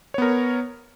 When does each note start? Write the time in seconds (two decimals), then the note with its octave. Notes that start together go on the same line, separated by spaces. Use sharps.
0.14 C#5
0.18 B3
0.22 A#4